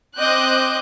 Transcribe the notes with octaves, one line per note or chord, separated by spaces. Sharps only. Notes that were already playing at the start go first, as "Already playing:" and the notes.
C4 D#5 D6 F#6 G6